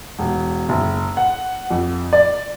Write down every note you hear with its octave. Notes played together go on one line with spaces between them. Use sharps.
E1
F#1
F#5
F2
D5